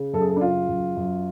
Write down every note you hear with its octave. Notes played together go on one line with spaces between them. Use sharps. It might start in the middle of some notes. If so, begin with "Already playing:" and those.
Already playing: C#3
F#2 A4
G#4
A4
D4
C#3 F4
F#2
F#2